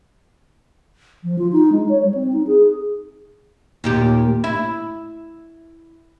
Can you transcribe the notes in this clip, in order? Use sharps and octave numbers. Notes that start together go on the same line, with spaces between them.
F3
F4
D#4
G#3
C#5
G3
C4
D#4
G#4
D#2 A#2 G4
E4